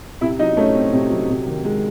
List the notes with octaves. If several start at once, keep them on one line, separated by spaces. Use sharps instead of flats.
C3 E4 E5
F#3 D#4 D#5
A3 C#4 C#5
C4
C3
F#3
C3
D#3
G#3